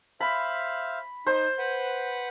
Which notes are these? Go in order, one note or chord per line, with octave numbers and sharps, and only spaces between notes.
C5 E5 F5 B5
D#4 C5
B4 F#5